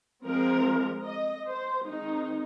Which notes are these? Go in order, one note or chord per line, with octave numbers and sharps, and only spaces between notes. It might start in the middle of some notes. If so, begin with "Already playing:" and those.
F3 G#3 C4 A#4
D#5
C5
D#3 G#3 C4 D#4